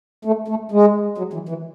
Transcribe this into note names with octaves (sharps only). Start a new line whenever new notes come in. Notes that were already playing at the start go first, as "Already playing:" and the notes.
A3
A3
G#3
F#3
E3
E3